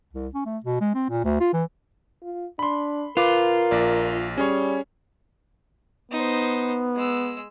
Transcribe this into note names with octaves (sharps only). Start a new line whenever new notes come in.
C2
C#4
A3
B2
G#3
C4
A#2
D2
F4
E3
F4
D4 B5 C6
F4 A#4 B4 D6
A#1 D5
G3 C#4 G#4 C#5
B3 D#4 C5
G#3 E6